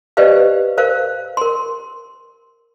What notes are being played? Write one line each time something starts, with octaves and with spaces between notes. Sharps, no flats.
G4 B4 C5 D5 D#5 F5
A#4 C5 F5
A#4 C6